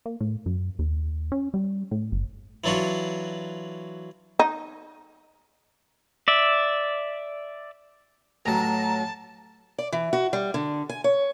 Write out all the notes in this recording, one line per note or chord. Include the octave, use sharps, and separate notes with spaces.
A#3
A2
F#2
D#2
C#4
G3
A2
G1
E3 F#3 D4 F4 F#4
D#4
D5 E5
A1 F#3 A5 A#5
D5
E3
F#4
G3
D3
G#5
C#5